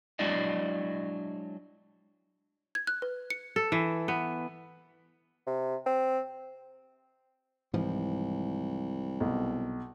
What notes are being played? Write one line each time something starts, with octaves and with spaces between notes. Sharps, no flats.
F#3 G#3 D4 E4 D5 D#5
G#6
F#6
B4
C#7
A4
E3
B3
C3
C4
C2 G#2 E3 F3
B1